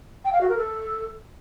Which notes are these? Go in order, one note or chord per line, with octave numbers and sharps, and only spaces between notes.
G5
F5
F#4
A#4
A4